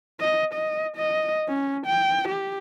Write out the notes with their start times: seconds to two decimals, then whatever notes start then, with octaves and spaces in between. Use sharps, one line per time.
0.20 D#5
0.53 D#5
0.96 D#5
1.48 C#4
1.86 G5
2.28 G4